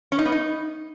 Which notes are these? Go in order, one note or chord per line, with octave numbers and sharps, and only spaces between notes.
C#4
D#4
B3
D#4